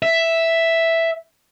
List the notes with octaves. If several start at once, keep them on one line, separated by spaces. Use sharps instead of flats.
E5